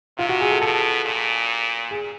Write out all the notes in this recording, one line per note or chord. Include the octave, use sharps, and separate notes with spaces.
C3 F4
F#4
G#4
A4
B2 A4
A#2
G#4